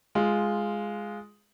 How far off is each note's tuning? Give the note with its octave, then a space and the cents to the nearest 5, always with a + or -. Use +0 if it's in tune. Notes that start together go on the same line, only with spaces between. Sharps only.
G#3 +0 F4 +0